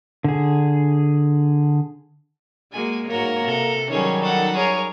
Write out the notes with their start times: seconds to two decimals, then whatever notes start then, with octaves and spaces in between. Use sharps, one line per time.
0.24 D3 G#4
2.72 G#3 A#3 F#4 G#5
3.09 G#2 A#3 F#4 A#4 C#5 A#5
3.46 C3 A4
3.90 D#3 F#3 G3 C#4 D#4 G#4 C#5
4.21 A4 F#5
4.56 G#4 A#4 C#5